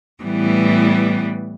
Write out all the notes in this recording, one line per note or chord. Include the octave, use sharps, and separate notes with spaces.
A2 E3 G3 B3